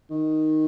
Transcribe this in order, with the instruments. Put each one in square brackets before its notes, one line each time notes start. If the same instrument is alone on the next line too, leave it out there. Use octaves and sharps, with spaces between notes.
[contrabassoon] D#3